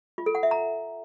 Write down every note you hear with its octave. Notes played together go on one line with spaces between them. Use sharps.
F4
A4
F#5
E5
A#5